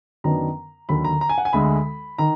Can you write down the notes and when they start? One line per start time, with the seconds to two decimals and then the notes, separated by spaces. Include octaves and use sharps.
0.24 F#2 D#3 F#3 B3 D4 A#5
0.89 D#2 D3 F#3 B5
1.04 A#5
1.21 A#5
1.29 G#5
1.38 F#5
1.45 G#5
1.53 D2 D3 G#3 B5
2.18 D#3 A#5